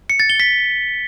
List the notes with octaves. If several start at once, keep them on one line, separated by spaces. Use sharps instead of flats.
C#7
A6
G7
B6